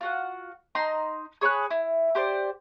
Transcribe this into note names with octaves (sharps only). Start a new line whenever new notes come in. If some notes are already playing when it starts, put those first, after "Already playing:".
F4 F#4 F#5
D#4 A#5 C6
G#4 C#5 B5 F#6
E4
G4 C5 D5